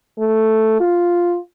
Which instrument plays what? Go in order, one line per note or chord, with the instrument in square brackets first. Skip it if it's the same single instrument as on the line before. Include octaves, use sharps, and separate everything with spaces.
[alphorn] A3
F4